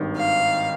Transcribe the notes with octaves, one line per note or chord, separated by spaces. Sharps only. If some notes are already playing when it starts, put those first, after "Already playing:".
Already playing: G#1 G2 D#3
F5